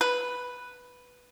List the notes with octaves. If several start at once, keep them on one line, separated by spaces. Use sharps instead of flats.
B4